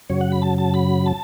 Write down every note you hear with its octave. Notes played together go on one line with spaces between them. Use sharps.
F#2 C#3 F#3 C#5
F#5
B5
A5
A5
B5
A5